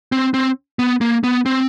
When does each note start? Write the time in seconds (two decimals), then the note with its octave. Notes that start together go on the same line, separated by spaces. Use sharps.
0.12 C4
0.34 C4
0.79 B3
1.01 A#3
1.24 B3
1.46 C4